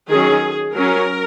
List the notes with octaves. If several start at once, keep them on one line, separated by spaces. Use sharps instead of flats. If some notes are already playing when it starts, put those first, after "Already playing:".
D#3 F#3 C#4 G#4
F#3 C#4 A#4